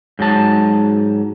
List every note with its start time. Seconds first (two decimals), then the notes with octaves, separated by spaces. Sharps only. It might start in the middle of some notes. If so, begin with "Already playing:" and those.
0.19 G#2 F#3 A5